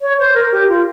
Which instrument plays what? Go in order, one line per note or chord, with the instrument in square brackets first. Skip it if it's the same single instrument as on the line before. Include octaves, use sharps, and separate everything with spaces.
[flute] C#5
C5
A#4
G4
F4